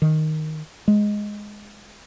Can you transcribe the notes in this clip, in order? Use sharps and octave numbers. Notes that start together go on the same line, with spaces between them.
D#3
G#3